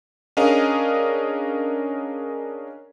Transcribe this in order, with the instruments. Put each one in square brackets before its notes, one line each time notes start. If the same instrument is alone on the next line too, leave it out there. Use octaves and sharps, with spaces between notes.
[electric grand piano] C#4 D4 G#4 A#4 D#5 F5